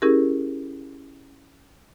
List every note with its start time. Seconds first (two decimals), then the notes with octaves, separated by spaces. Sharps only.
0.02 C#4 E4 G4 G#4 A#4